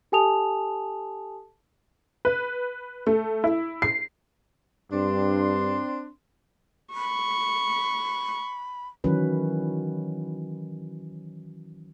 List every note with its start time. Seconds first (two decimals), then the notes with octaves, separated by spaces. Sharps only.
0.12 G4 A4 G#5 A5 D#6 F7
2.25 B4
3.07 A3
3.44 E4
3.82 C7
4.92 G2 C4 D4 C6
6.94 B5 C#6
9.04 D#3 E3 F#3 C#4 B4